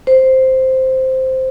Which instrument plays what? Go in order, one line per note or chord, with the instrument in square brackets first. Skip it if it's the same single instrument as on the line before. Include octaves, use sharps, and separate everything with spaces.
[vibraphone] C5